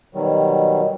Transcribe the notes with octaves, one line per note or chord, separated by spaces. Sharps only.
B2 D#3 F#3 G3